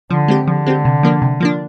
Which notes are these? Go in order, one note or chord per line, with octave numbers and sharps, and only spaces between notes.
D3 F3
G#3 C4 G4
D3 F3
G#3 C4 G4
C3
F3 A#3 D4
C3
F3 A#3 D4